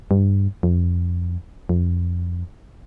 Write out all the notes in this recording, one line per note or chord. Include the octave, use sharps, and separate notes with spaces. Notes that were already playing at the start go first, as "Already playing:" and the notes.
G2
F2
F2